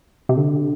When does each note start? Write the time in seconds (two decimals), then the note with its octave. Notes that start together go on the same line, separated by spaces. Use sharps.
0.29 C3
0.37 D3